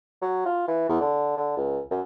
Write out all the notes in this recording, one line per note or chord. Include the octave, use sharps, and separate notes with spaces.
F#3
F4
E3
E2
D3
D3
C#2
F#2